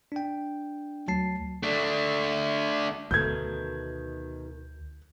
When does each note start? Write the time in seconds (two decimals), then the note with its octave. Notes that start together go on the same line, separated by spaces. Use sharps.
0.12 D4 G5
1.08 D2 F#3 A5 C7
1.63 A3 D4
3.11 D2 B2 D#3 A3 G6 G#6